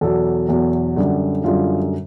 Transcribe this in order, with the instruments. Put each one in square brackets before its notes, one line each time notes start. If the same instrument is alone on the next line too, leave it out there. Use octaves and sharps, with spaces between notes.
[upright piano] E2 B2 F#3 A4
E2 B2 F#3
F#2 D3 G3 F#4
F#2 D3 G3 F4